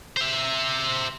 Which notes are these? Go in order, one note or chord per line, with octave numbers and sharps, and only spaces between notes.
C5 E5